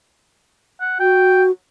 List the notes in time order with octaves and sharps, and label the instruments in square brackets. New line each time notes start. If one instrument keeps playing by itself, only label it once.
[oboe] F#5
[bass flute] F#4 [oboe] G5